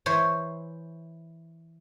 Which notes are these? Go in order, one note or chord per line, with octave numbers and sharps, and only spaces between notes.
E3 C5 C#5